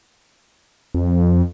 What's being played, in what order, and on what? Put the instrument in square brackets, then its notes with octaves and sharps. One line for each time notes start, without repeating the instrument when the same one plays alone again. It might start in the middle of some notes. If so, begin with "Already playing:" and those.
[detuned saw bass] F2